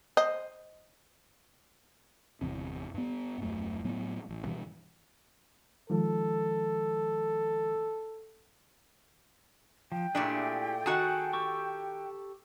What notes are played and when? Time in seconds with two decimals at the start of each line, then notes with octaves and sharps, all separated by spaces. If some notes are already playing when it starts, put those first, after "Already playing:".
0.17 C5 D#5
2.41 G1 E2 C3
2.94 G2 B3
3.41 D#1 F#2 A3
3.84 A2 F#3 B3
4.29 A1
4.45 G2 B2 E3
5.90 D#3 F3 G#3 A4
9.92 F3 G5
10.15 A#2 A3 D4 E4 G4 G#4
10.86 D#3 F#4 G#4 A4 F#5 A5
11.33 G4 A4 C#6